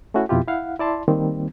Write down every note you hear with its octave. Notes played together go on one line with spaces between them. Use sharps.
A3 C#4 E4 F#4
F2 B2 E4 F4 G4
E4 F5 F#5
E4 D5 A5 C6
D#3 G3 A#3 C4